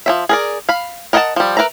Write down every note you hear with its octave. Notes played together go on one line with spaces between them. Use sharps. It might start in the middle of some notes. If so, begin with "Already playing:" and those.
F3 C4 E5
G#4 A#4 D5
F5 B5
A#4 D#5 F#5 G#5 A5
F3 G3
A#4 B4 E5 A#5